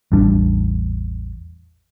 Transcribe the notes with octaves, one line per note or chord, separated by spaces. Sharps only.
A1 E2 G3 D4